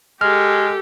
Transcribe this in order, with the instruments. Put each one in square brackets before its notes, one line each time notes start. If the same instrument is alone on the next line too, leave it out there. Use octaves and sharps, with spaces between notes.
[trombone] G#3 [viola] G4 A4 [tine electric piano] F6